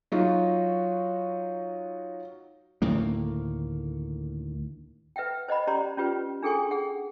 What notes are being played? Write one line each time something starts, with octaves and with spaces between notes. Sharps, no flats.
F#3 D#4 F4 F#4
D2 A2 D#3 A#3
B4 E5 F#5 G5
C5 D#5 F#5 B5
C#4 G4 D5 A#5 C6
C#4 F4 G4 B4
D4 G#4 A4 G5 G#5 C#6
G#4 F#5